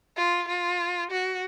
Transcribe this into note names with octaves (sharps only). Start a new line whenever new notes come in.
F4
F4
F#4